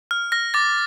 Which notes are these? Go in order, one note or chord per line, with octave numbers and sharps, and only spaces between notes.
F6
F6 A#6
D6 A6